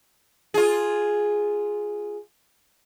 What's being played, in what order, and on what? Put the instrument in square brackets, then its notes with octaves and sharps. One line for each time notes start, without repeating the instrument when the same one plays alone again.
[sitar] F4 G#4